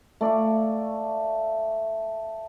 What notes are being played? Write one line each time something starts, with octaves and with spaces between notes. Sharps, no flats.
A3 D5 F5 C#6